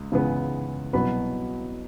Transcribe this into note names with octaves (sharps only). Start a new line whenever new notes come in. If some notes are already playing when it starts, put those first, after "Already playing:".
Already playing: C#2
C#2 C#3 E3 G#3 B3
C2 B2 F#3 B3 B5